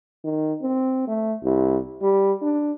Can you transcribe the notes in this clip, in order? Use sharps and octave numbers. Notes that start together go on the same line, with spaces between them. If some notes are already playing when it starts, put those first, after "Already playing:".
D#3
C4
A3
C2
G3
D4